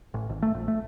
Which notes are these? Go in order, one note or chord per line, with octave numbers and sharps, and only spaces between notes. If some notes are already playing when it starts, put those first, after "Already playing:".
A1
G#1
A3
A#1
A3